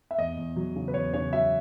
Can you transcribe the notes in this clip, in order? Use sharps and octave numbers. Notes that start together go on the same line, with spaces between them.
E5
E2 D#5
E2
F#3
C#3
B4
E2 C#5
C#3 C#5
F#3 E5